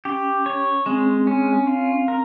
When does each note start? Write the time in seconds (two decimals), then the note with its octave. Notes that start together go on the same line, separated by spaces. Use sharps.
0.05 C#4 G4
0.46 C#5
0.86 G#3 C4
1.27 C#4
1.67 F4
2.08 A#4